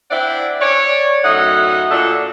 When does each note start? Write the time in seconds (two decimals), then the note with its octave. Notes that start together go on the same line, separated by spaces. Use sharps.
0.11 C4 D4 E4 D5 E5 F#5
0.61 C#5 D5
1.24 F#2 A2 D#4 D#5 E5 F#5
1.91 A#2 D4 F#4 A4 E5